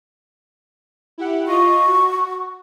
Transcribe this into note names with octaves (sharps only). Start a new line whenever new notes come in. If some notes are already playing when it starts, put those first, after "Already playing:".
E4 G4 F#5
F4 D#5 C#6
F#4